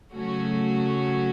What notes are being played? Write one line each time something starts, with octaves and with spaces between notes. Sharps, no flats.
C#3 F#3 A3 C#4 F#4